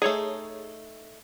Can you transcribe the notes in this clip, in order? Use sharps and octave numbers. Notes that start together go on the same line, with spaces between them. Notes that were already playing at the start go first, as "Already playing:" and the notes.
A3 D#4 G#4 C#5